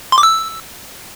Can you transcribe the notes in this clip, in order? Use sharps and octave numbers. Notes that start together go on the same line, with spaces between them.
C6
D6
E6